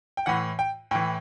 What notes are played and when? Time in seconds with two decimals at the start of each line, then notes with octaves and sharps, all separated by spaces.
0.17 G5
0.26 A2 E3 F#5
0.59 G5
0.91 A2 E3 G5